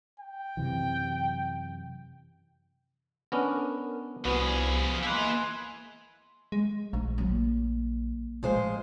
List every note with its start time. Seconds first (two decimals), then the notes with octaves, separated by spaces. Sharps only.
0.20 G5
0.57 F#2 C3 E3
3.32 B3 C#4 D4 A#4
4.25 C2 F3 B3 F#4 G#4
5.03 G#3 A#3 E4 G#4 B4 G#5
6.52 G#3
6.93 A#1 A3
7.18 F#3 A#3
8.43 A1 F3 G#3 C5